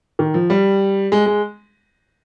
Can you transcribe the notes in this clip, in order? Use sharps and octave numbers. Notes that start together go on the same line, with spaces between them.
D#3
F3
G3
G#3
G#3